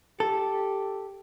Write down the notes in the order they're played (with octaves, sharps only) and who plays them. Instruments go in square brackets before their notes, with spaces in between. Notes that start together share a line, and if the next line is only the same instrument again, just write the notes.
[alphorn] G4 [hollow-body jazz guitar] A4